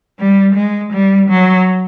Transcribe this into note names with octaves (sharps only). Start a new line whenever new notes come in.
G3
G#3
G3
F#3